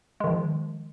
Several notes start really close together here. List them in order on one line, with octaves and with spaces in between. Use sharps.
G#3 D#3 F3